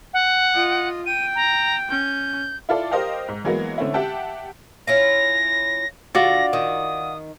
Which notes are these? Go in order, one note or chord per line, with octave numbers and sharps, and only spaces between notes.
F#5
F4 D#5
G5 D#7
A#5
C#4 G6
E4 F4 A4 D5
G4 A#4 C5 D#5 F5 G5
G#2
E3 F#3 G#3 A#3 B3
D3 A3 C4 C#4 E4
G4 E5 F#5 G5 A5
C#4 E4 F4 A#6
D3 F4 F#4 D5 A#6
D#3 D#6